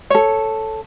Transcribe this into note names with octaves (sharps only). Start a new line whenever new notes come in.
A4 C#5